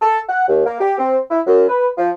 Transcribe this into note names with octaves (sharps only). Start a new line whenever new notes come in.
A4
F#5
D#2
A#3
G4
C4
E4
F#2
B4
F3